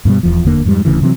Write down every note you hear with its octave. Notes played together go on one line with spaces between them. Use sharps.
G2 B2 F3 G3
E1 E2 F3
F1 E2 D3 A#3
F2 G#2 E3 G3
D1 D2 C#3 E3
C3 E3 F#3 C4